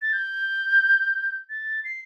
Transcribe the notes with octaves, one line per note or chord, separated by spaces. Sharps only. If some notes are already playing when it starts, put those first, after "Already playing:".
A6
G6
A6
C7